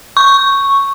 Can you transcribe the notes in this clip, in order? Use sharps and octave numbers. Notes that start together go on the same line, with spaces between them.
C#6